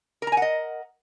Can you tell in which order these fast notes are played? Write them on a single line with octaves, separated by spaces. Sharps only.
A#4 A#5 G#5 F#5 D#5